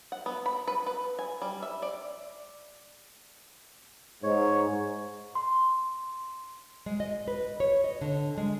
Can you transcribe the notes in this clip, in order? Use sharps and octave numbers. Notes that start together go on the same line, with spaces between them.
F#5
B3
B5
B4
B4
G#5
G3
E5
D5
G#2 C#5
C6
G#3
D#5
B4
C#5
D#5
D3
G#3